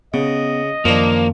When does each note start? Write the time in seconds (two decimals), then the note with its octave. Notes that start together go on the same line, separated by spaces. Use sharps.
0.14 C#3 B3 D#5
0.85 F#2 D#3 F3 A#3 D4